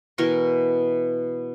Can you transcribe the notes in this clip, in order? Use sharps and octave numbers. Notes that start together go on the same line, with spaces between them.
B2 E3 A#4 C#6